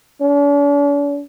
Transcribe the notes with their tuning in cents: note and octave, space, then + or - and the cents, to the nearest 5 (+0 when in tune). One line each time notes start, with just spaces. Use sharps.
D4 -45